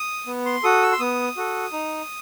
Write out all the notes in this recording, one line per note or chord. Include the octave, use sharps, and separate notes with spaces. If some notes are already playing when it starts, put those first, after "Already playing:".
Already playing: D#6
B3
C6
F#4 A4 D#6
E6
C6
B3 D#6
F#4 A4
D#4